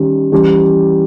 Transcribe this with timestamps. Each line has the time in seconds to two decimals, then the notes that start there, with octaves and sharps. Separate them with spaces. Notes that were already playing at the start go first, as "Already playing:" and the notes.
Already playing: D#3 G3 C#4 G4
0.32 E3 G3 C#4 G4